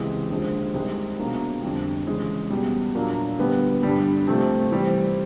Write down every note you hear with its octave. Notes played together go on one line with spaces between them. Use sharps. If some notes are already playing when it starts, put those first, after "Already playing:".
Already playing: C#2 C3 E3 G#3
D#2 D3 F3 G#3
C2 C3 D#3 G#3
B2 F#3 A#3 D4
F2 D3 G3
C#3 E3 G#3
E2 B2 G3
A#2 F#3 A#3 D4
D3 G3 B3
G2 D3 G3
C3 F3 A3
E3 G3 C4